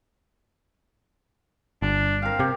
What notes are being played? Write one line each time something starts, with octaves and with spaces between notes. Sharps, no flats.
G1 D4
C4 A#4 F5
C3 G4